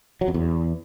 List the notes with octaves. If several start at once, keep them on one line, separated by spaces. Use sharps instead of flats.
F#3
F2
E2